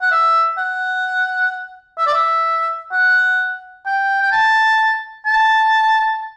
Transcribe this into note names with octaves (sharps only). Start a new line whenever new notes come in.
F#5
E5
F#5
E5
D5
E5
F#5
G5
G5
A5
A5